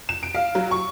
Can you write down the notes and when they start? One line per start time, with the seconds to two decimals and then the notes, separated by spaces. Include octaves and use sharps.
0.09 E7
0.23 D7
0.35 F5
0.55 F#3
0.71 C#6